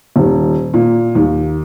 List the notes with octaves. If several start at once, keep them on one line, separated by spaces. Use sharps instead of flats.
D#1
A#2
D#2